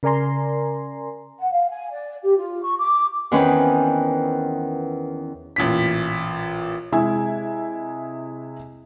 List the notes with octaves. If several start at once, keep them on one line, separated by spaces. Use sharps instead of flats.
C#3 A#4 D5 G#5 A#5 C6
F#5
F5
G#5
D5
G4
F4
C#6
D6
E2 D#3 C4 C#4 B4
A1 A#2 B6
C3 G#3 E4 G#5 E6